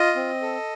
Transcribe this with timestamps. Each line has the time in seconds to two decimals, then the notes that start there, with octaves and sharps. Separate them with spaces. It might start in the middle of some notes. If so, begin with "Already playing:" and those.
Already playing: F4 D#5
0.16 C4
0.42 A4